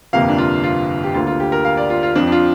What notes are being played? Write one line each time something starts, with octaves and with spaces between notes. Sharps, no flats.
G1 F2 C3 A#3 F5
D4
F4
F4
G4
D2 D3 A#3 F4
F4
G4
A#4
F5
D5
F4
F4
F2 F3 C4 D4
D4
F4